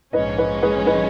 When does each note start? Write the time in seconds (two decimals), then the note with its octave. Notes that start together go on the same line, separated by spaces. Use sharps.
0.13 A#1 G#2 F3 G#3 C#4 B4 D#5
0.38 B4 D#5
0.63 G#4 B4
0.87 B4 D#5